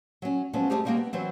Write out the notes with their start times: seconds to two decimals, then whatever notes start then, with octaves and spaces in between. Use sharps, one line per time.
0.22 F#3 C#4
0.53 F3 F#3 G#3 B3 C#4
0.70 G#3 A3 C#4 G4 G#4 C5
0.85 G3 G#3 A#3 F#4 G5
0.97 B3
1.13 E3 F#3 C4